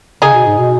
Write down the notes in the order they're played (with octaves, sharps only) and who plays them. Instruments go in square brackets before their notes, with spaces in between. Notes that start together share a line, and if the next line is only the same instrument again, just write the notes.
[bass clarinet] C#3 [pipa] D#4 G#4
[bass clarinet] B2
G#2
B2